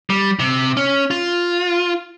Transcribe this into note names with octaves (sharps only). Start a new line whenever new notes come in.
G3
C3
C#4
F4